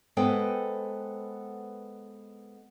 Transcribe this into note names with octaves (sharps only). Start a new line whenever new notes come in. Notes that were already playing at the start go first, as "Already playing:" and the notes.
G#3 B3 A4 B4 C5 G5